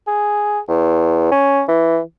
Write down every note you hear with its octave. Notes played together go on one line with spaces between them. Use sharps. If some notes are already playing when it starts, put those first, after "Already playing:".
G#4
E2
C#4
E3